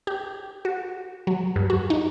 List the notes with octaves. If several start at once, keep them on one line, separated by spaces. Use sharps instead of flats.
G4
F#4
F#3
G2
F#4
D#4